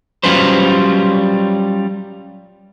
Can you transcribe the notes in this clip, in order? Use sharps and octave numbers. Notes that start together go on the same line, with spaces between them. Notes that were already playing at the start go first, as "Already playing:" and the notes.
F#3 G3 C#4 F4 B4 C5